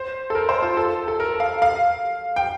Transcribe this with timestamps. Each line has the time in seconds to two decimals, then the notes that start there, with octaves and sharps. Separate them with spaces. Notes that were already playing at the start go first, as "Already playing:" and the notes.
Already playing: C5
0.30 A4
0.35 A#4
0.49 C5
0.62 F4
0.77 A4
1.08 A4
1.20 A#4
1.40 F5
1.62 F5
2.36 G5